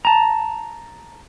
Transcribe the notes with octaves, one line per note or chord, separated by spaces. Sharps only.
A5 A#5